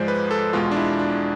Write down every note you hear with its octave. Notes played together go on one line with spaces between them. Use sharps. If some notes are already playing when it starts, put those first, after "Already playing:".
Already playing: G#2 F3 G#3 C5 D5
B4
A4
E2 B2 G#3 F4
D4
E4
D4